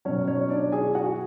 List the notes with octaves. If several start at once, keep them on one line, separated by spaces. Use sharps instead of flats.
B2 F#3 C#4 C#5
C#4 C#5
D4 D5
G#4 G#5
F#4 F#5